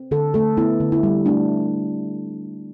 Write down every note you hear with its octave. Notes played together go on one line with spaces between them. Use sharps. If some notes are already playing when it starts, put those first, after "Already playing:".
Already playing: C4
D3 A4
A3 A4
B3 E4
D3
E4
G3
A3 D4